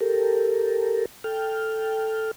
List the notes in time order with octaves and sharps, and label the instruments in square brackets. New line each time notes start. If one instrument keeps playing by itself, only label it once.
[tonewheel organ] G4 A4 A#4
A4 G5 F6